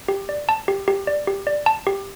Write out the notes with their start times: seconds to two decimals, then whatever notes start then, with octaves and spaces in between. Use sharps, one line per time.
0.08 G4
0.29 D5
0.49 A5
0.68 G4
0.88 G4
1.07 D5
1.27 G4
1.47 D5
1.66 A5
1.87 G4